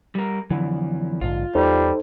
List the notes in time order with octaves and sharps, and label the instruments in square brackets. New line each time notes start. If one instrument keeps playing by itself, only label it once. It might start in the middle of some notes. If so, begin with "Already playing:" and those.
[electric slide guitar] G3 A#4
[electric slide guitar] F2 E3 [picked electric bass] D3 F#3
[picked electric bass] A#1 G#2 D3 [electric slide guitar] F4
[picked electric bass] E2 [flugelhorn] G3 [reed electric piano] D#4 A4 C5